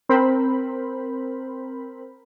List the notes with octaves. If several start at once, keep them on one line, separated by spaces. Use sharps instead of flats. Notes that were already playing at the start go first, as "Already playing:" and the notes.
C4 A#4 C5 B5